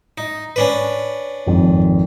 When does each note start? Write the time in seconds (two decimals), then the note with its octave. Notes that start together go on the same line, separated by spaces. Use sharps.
0.18 D#4
0.56 C#4 D4 B4
1.46 G#1 F2